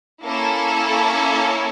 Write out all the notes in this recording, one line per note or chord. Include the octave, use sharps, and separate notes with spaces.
A#3 C#4 E4 A4